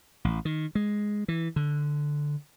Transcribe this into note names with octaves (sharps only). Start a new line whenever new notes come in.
A1
D#3
G#3
E3
D3